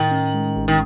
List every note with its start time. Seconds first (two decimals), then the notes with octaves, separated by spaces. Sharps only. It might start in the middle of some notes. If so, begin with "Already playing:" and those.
Already playing: A2 D#3
0.11 C#4
0.34 G#3
0.56 A1
0.68 D#3